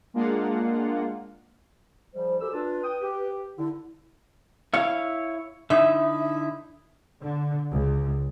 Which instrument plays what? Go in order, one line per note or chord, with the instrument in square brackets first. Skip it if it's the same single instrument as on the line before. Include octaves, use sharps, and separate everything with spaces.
[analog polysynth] G#3 A#3 D4 F4 F5 F#5
[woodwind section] G#2 F3 G3 [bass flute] C5
[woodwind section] F#2 G4 E6 [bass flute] A4
[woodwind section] D4 F4 [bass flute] B4
[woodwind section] G5 D#6
G4
[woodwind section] D3 [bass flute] E4
[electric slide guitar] E4 C#5 [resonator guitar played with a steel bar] F5
[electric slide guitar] D3 D#4 E4 [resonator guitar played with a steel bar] E5
[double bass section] D3
C#2